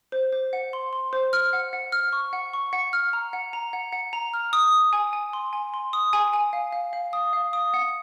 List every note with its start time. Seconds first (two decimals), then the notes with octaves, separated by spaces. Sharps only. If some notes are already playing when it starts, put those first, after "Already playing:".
0.12 C5
0.32 C5
0.53 F#5
0.73 C6
0.93 C6
1.13 C5
1.33 F6
1.53 F#5
1.73 F#5
1.92 F6
2.13 C#6
2.33 F#5
2.53 C#6
2.73 F#5
2.93 F6
3.13 A#5
3.33 F#5
3.53 A#5
3.73 F#5
3.92 F#5
4.13 A#5
4.34 F6
4.53 D#6
4.73 D#6
4.93 G#5
5.13 G#5
5.33 C6
5.53 G#5
5.74 C6
5.93 D#6
6.13 G#5
6.33 G#5
6.53 F5
6.72 F5
6.93 F5
7.13 D#6
7.33 F5
7.53 D#6
7.74 F#5